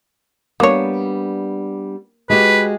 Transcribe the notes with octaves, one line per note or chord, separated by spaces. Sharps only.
G3 A#3 B3 D4 C#5
G#3 F#4 G4 B4